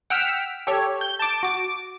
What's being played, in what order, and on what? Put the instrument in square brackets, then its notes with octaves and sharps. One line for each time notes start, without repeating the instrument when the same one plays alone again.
[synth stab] F#5 G5 E6 F6 B6 D7
G4 A4 C#5
G6
A5 D6
F#4 D6